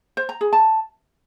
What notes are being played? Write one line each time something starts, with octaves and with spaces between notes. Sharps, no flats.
C5
A#5
G#4
A5